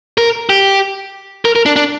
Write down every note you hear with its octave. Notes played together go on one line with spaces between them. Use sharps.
A#4
G4
A#4
A#4
D4
D4